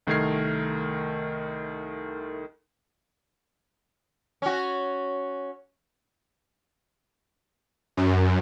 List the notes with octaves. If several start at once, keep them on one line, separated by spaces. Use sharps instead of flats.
C2 D#3 A3 A#4 G#6 C7
C#4 F#4
F#2